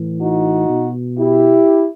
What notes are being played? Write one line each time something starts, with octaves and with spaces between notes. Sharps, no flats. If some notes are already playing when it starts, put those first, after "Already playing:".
Already playing: A2 E3
D#4 F#4
B2
E4 G4